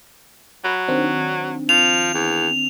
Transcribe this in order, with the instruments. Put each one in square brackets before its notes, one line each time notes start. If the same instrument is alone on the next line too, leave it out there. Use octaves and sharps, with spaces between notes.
[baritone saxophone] F#3 [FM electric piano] B5
[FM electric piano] D#3 C4 D4
[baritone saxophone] F3 [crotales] F7
[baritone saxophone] E2